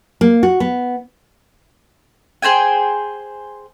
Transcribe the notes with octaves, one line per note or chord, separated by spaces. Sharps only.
A#3
F#4
B3
G#4 C5 G5 G#5